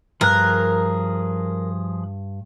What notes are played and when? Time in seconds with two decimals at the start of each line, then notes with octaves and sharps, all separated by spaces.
0.21 G2 F3 G#4 A#4 F#6